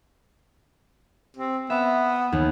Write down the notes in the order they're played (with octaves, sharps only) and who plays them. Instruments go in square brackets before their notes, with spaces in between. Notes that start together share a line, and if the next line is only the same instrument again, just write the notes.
[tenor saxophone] C4
[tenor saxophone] B3 [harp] E5
[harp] D#2